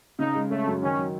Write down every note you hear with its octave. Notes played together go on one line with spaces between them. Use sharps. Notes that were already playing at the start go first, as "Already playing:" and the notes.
C#3 D#4
G#3
A3 C#4
F#2
D#3 C#4
F#3